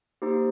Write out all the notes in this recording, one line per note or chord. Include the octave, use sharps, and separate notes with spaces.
A#3 D#4 G4 C5